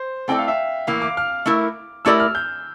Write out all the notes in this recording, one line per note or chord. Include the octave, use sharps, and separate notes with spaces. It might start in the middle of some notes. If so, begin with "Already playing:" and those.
Already playing: C5
A3 C4 E4 A4 D5 G5
F5
E5
A2 E3 A#3 E4 F5
D6
F6
A3 E4 A#4
A3 E4 G4 A#4 D5 E6
F6
G6